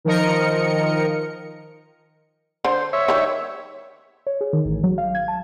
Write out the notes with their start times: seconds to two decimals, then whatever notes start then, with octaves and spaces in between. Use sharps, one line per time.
0.05 D#3 F3 A#4 D#5 C#7
2.65 D3 C5
2.93 C#5 E5
3.08 D#3 G3
4.27 C#5
4.41 G#4
4.53 D#3
4.65 A1
4.84 F#3
4.98 F5
5.15 G#6
5.28 A5